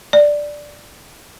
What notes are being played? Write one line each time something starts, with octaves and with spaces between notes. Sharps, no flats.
D5